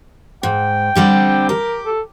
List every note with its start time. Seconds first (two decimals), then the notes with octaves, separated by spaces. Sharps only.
0.43 G#2 G5
0.95 D3 G3 C4
1.49 G4 A#4
1.85 A4